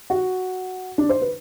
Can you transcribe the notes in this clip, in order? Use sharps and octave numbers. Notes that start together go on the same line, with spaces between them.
F#4
D4
C5
B4